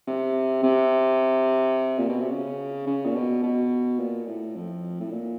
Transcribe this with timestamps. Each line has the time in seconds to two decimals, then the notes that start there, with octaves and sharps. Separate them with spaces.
0.07 C3
0.63 C3
1.98 A#2
2.09 B2
2.20 C3
2.31 C#3
2.87 C#3
3.05 A#2
3.15 B2
3.43 B2
3.99 A#2
4.27 A2
4.55 F2
5.00 A2
5.11 A#2